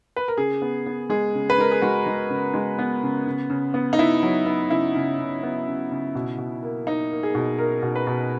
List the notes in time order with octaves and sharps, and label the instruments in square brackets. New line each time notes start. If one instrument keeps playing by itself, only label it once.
[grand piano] B4
A#4
C#3 G#4
B3
B3
G#3 G#4
C#3
B4
G#3 A#4
G#4
G#3 F#4
G#3
C#3
G#3
B3
C#3
C#3
C#3
B3
D#4
B3 E4
F#3
B3
C#3 E4
C#3
C#3
B3
C#3
C#3
B2
B2
A#3
A#3 D#4
A#3
G#4
B2
A#3 A#4
B2
B4
B2